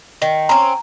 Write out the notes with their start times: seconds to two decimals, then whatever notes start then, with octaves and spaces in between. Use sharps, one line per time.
0.22 D#3
0.49 C4 C#4 A#5